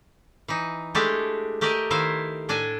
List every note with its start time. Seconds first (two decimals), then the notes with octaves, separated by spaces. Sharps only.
0.48 E3 D#4
0.95 G#3 A3 D4 E4 G4 A4
1.61 A3 G4 A#4 D5 D#5
1.91 D#3 E4 C5 E5 F5
2.49 A2 D4 A4 G#5